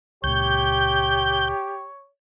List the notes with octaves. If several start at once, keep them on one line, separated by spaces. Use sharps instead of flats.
C#2 A#2 G4 C#5 G6